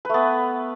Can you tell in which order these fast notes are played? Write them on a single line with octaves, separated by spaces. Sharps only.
B4 A3 B3